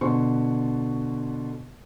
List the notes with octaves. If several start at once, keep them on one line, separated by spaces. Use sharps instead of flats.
B2 D3 C5 C6 C#6